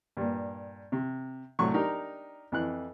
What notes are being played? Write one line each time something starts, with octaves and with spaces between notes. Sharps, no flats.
G2 A#2
C3
C2 A2 F#3 C#6
D4 D#4 G4 A#4
F2 E3 F#6